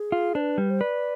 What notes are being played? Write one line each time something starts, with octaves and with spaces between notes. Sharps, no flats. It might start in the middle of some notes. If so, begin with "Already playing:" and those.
Already playing: G#4
F4
D4 C5
B4
G3
C5
B4 D5